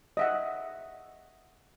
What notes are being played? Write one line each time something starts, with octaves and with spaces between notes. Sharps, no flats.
D#5 E5 F#5